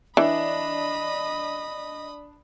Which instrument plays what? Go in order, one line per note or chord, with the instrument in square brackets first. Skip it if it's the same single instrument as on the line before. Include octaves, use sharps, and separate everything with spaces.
[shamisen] E3 [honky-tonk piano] D4 [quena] D#5 [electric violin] B5 D#6